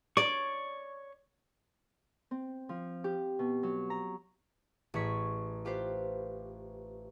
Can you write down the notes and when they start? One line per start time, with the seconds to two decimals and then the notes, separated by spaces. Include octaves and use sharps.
0.17 C#5 D5 C#6
2.31 C4
2.69 F3
3.04 G4
3.39 B2
3.63 F#3
3.90 A#5
4.94 A1 G#4 C#6 B6
5.65 F4 G4 B4 C5